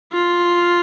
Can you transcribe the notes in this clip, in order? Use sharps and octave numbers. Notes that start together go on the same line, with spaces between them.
F4